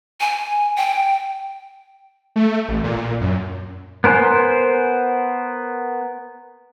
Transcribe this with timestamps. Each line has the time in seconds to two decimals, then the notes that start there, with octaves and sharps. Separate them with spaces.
0.21 G#5
0.77 G5
2.36 A3
2.69 A1
2.84 A#2
3.21 F#2
4.04 B3 A#4 C5 G#5 F#6